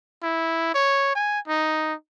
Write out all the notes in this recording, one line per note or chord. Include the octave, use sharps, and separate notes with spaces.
E4
C#5
G#5
D#4